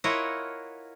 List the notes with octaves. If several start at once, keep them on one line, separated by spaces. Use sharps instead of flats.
E4 F4 A#4 C#5 D#5 F#5